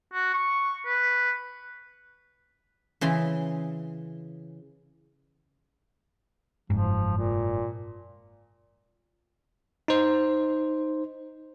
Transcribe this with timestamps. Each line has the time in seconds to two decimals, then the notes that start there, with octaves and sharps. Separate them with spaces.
0.14 F#4
0.33 C#6
0.86 B4
3.01 C#3 E3 C6
6.70 F#1 G#2 F3
7.17 A#2
9.88 D#4 C5